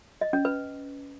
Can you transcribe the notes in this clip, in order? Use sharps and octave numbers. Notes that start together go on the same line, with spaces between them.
D#5
C#4
B4